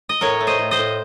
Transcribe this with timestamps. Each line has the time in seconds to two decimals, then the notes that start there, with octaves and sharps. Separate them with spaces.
0.09 D#5
0.21 A2 A#4 C#5
0.40 A3
0.47 C5 D#5
0.59 A2
0.71 C5 D#5
0.79 A2